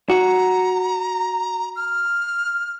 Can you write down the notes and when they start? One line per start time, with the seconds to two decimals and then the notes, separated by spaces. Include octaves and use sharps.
0.10 F#4 A#5
1.76 F6